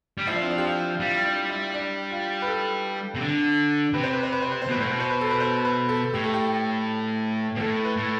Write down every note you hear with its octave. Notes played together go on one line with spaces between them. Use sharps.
G3
F3 E4
D4
C4
D4
G4
F4
G3 F4
D4
E4
D4
F4
B4
A4
C3
D3
C3 B4
C5
B4
C5
B4
C5
B4
C5
B2
B4
A2 C5
B2 B4
C5
B4
A4
B4
C5
B4
A4
A2 G4
A4
G4
B2
A2 A4
B4
A2